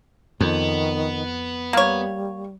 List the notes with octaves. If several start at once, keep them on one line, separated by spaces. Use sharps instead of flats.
F2 D#3 B3
G3 A#3 C#5